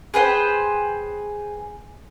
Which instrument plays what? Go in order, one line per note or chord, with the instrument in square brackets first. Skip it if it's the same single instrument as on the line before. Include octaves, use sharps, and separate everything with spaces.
[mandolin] G#4 B4 C5 G5